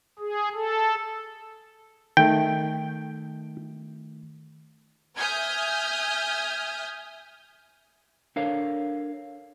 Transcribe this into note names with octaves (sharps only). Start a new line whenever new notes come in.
G#4
A4
D#3 A3 G5
E5 G#5 D#6 F6 G6 G#6
D4 A4 A#4 C#5 F5